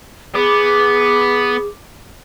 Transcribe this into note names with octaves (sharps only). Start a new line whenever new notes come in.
B3 G#4 D6